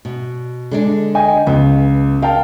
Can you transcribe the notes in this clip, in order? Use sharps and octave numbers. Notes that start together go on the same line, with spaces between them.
B2
D3 G#3 D4
D#5 G5 G#5
C#2 B3
A#4 F5 G5 A5